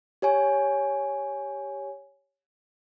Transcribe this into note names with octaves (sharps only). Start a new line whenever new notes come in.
G4 C#5 G#5